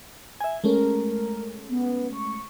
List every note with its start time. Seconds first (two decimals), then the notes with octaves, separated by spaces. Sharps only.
0.41 E5 G#5
0.64 G#3 A3 C#4 A#4
1.69 B3
2.13 C#6